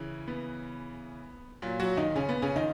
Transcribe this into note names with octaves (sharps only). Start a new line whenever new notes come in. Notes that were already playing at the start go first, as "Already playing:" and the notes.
Already playing: C#3 E3
B3
A#2 F#3
F#3 F#4
D#3 D#4
C#3 C#4
B3
C#3 C#4
D#3 D#4